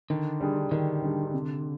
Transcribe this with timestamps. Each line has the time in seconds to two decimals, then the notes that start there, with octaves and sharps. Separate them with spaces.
0.10 D3 D#3
0.41 G3 D4 G#4
0.71 D3 D#3
1.02 G3 D4 G#4
1.33 C3